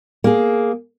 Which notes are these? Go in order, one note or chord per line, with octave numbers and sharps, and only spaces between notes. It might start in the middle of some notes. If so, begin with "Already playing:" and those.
A#3 G#4